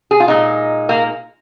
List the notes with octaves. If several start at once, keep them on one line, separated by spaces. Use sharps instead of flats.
G#4
F4
A#2 G#3 D#4
A#3